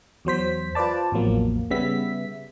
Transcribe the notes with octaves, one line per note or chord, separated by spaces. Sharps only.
E2 F#3 C5 B6
F4 B4 C5 D5 A5
A1 E2 F3 F#3 A#3
C#3 G3 B3 E5 B6